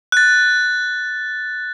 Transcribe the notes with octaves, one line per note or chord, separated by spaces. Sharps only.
F#6 A6